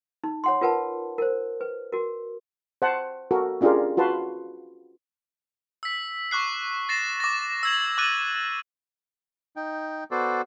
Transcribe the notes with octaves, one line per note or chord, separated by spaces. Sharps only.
D#4
C#5 F#5 C6
F4 A#4 B4 F#5 A5
A#4 C5
B4
F#4 A#4
C5 F#5 A5
F#4 A4 A#4
C#4 D4 F4 G4 G#4 A#4
F4 F#4 B4 A5 C6
E6 B6
C#6 D6 F#6 C7
A6 A#6 C7 E7
D6 A#6
E6 G#6 F#7
D6 F#6 A6 D#7
D#4 G5
B3 F#4 A4 C5 D5